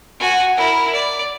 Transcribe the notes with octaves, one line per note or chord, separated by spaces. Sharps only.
F#4 G#5
E4 A#4
D5